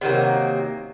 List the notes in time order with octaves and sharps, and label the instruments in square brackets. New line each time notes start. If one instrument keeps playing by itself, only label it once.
[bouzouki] C3 D#3 F#3 A#3